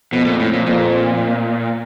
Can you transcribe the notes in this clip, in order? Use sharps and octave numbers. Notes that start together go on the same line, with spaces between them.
F2 B2
A#2
A2
A#2
F2 A#2